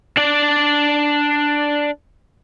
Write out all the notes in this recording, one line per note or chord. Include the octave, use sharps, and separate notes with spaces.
D4 D5